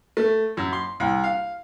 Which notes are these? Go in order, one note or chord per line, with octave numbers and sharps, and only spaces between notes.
A3
F#2
C6
C2
F5